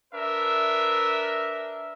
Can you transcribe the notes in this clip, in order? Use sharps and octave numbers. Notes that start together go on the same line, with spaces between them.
D4 A#4 B4 E5